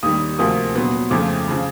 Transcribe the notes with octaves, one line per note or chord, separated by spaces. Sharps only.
D#2 D#3 G3 D#6
D2 C3 F3 A#3 D#6
A#2 F#3 B3
F2 C#3 F3 A3 D6
C#3 F3